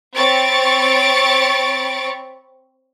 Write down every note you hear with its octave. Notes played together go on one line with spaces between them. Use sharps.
C4 C#5 B5 C#6 A6 D7